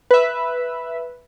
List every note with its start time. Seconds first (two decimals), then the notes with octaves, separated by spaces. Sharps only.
0.11 B4 E5